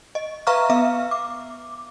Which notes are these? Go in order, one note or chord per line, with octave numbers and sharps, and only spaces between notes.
D#5
B4 E5 F5 A#5 C#6 F6
B3 E5 F5
D6